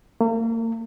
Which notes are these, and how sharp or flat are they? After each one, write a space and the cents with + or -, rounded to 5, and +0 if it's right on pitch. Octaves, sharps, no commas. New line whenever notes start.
A#3 -40